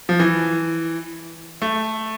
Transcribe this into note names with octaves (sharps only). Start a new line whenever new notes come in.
F3
E3
A3